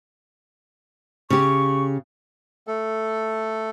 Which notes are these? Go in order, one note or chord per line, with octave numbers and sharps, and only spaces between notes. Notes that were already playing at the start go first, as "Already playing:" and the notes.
C#3 G4 C#6
A3 A4